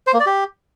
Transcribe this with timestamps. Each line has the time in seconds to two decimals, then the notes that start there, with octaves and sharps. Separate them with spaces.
0.07 C5
0.13 A#3
0.20 D5
0.26 G4